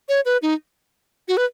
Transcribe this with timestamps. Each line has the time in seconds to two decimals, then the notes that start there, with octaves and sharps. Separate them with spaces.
0.09 C#5
0.25 B4
0.42 D#4
1.28 F#4
1.37 B4